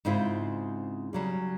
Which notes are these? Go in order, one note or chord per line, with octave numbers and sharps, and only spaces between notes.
G#2 C#3 C4 E4 F4
C#3 F#3 G3